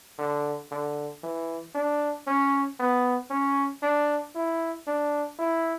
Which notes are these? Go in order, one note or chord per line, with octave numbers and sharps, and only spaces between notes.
D3
D3
E3
D4
C#4
B3
C#4
D4
E4
D4
E4